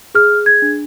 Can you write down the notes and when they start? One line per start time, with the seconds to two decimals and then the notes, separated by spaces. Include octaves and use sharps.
0.15 G#4 F6
0.46 G#6
0.62 D4